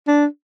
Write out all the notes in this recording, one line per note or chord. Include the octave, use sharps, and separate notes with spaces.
D4